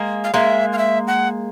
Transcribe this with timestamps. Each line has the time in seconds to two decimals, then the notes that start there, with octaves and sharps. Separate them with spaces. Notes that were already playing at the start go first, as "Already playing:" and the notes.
Already playing: G#3 A#3
0.24 F5
0.34 G#3 A#3 E5
0.73 F5
0.78 E5
1.07 F#5